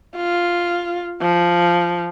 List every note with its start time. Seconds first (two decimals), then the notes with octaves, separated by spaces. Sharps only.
0.17 F4
1.21 F3